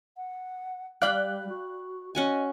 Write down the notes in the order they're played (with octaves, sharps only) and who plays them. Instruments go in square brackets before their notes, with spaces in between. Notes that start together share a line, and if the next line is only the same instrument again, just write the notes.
[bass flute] F#5
[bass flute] G3 [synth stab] D5 F5 F#6 [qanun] G5 B5
[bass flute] F#4
[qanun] C#4 F#4 G#5 [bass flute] D#5